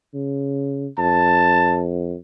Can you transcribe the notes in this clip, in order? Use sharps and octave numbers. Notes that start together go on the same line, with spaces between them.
C#3
F2 A5